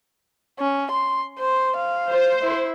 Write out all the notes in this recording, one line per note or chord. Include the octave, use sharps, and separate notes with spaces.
C#4
C6
C5
F5
C5
E4